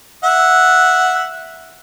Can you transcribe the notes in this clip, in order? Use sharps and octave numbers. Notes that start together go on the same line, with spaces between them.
E5 F#5